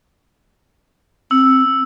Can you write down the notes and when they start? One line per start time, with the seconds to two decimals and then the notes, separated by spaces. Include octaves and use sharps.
1.31 C4 E6